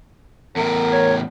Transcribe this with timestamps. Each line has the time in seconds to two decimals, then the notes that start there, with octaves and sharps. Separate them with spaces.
0.56 E2 A2 A#4
0.92 C#5